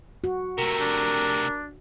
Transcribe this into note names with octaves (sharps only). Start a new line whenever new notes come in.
F#4
C3 A3 A#4
D4